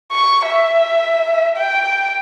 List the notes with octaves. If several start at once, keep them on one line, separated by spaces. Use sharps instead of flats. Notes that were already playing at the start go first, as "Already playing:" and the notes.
C#6
E5
G5